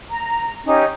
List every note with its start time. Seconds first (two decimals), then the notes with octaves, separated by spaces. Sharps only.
0.11 A#5
0.65 C#4 D#4 G4